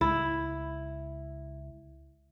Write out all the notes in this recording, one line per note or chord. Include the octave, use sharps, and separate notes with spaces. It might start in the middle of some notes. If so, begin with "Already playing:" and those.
C#2 E4